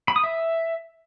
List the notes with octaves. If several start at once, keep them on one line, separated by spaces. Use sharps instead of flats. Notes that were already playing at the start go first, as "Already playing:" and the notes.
B5
D#6
E5